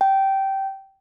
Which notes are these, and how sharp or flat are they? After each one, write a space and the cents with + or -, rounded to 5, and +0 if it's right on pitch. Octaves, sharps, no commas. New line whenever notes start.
G5 -15